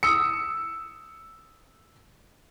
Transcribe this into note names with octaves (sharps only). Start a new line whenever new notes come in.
D#6 E6 C#7